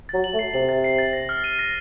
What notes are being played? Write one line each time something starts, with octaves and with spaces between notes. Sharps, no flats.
F#3 A6
F#7
A3
C7
C3 F#7
A6
C7
A6
A#6
F6
D#7
A#6